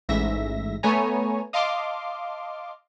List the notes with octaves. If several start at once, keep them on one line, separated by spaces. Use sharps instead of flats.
A1 G#2 E5 A#6
A3 B3 C#5 G#5 A#5
D#5 F5 A5 C6 D6